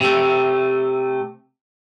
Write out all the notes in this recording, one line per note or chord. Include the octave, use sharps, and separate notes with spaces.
C3 A3